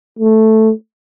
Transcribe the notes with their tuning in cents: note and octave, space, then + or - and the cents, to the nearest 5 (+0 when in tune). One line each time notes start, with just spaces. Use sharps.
A3 +0